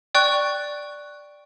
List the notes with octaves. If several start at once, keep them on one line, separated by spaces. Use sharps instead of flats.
D5 G5 C#6 F#6